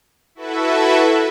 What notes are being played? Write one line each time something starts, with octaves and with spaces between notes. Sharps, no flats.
E4 F#4 A4 B4 E5